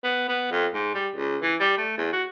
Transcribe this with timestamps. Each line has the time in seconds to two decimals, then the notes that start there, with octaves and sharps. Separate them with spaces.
0.04 B3
0.29 B3
0.51 F2
0.74 G#2
0.94 G3
1.16 C#2
1.42 E3
1.60 G3
1.78 A3
1.98 E2
2.13 F#4